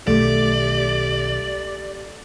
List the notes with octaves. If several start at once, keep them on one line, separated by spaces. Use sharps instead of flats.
B1 D#3 A3 G4 D5